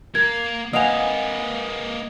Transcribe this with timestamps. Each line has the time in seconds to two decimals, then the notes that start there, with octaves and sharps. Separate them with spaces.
0.15 A#3 A#4 G#6
0.73 A#3 B4 D#5 F5 F#5 G#5 D#6 F7